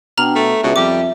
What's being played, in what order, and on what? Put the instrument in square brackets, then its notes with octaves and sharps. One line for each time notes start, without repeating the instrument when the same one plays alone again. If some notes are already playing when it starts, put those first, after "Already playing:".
[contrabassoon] B2 [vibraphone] D4 G5 [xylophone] A#5 F6
[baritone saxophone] A3 [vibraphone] E5
[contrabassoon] C#2 [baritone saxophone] B2 [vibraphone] E5
[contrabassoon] F2 [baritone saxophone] G3 [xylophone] D6